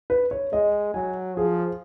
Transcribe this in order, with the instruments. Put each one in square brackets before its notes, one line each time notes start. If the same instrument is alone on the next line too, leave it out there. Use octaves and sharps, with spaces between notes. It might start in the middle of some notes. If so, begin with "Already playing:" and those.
[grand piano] B4
C#5
[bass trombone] G#3 [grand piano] D#5
[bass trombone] F#3 [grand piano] G#5
[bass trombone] F3 [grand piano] G#4